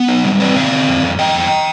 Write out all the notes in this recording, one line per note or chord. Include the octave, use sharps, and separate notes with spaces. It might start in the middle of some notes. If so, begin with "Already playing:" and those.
Already playing: B3
D#4
G3
C4 B4 D5
C3 D5 F5
C4
F2
F2
F2 D#5 G5
F2